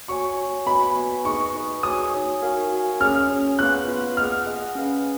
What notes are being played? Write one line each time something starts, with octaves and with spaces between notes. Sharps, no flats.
F#4 C#5 G#5 C#6
F#4 C#5 G#5
B3 F#4 B4 D#5 G#5 B5
B3 F#4 B4 D#5 G#5
D#4 G#4 B4 D#5 C#6
D#4 G#4 B4 D#5
D#4 F#4 C#5 G#5 D#6
D#4 F#4 C#5 G#5
F#4 A#4 F5 G#5
F#4 A#4 F5 G#5
C#4 G#4 C#5 F6
C#4 G#4 C#5
B3 F4 B4 F5 F#6
B3 F4 B4 F5
G#4 D#5 F#5 F6
G#4 D#5 F#5
C#4 G#4 B4 F5